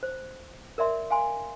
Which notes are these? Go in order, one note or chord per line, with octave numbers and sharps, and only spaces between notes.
C5
A#4 D5 E5 C6
F5 G#5 C6